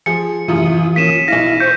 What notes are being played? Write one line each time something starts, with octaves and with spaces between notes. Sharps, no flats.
F3 G#4 C#7
F#2 A2 C3 E3 F4 D#6
A#3 C#4 B6 D#7 E7
B1 E4 F5 A#6
C5 C#6 G6